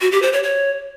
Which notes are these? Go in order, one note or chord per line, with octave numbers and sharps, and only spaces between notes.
F#4
G4
C5
C#5
C#5